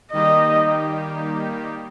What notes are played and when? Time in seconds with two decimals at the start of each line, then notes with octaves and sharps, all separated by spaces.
0.12 D#3 G3 A#3 D#4 G4 D#5